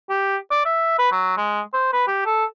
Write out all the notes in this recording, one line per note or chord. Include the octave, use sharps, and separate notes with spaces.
G4
D5
E5
B4
F#3
G#3
C5
B4
G4
A4